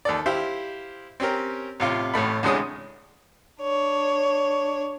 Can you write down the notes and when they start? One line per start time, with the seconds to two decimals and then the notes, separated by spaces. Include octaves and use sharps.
0.05 D#2 A4 D5
0.26 E4 G4 C5 F5
1.20 C4 C#4 G4 A#4
1.80 A1 C3 F4
2.14 A1 A2 A3 B5
2.43 D2 A2 C3 G#3 C#4 D#6
3.61 D4 C#5